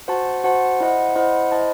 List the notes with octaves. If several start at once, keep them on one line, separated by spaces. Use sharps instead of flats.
F#4 C5 F#5 A5
F#4 C5 F#5 A5
E4 C5 D#5 F#5
E4 C5 D#5 F#5
E4 C5 D#5 A5